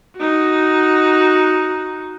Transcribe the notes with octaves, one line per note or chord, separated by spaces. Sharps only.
D#4 F#4